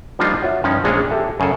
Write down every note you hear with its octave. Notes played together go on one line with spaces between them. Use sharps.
F3 G3 A#3 D4 D#4 F4
F#4 C#5 E5
G2 F3 C#4 D#4
A#1 G#3 A#3 D4 G#4 C#5
G4 A4 E5
F#2 C#3 G#4 A4